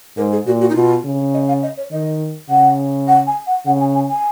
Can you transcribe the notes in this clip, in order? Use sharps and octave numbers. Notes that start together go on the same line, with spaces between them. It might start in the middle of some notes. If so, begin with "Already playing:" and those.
G#2 A#4
G#4
A#2 F#4
F#4
D#4
B2 F4
C#3
D#5
F5
D#5
C#5
D#3 D#5
C#3 F#5
F#5
G#5
F#5
C#3 F#5
G#5
G#5
G#5